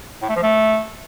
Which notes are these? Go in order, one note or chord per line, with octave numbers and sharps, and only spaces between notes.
A2
A3
F3
A3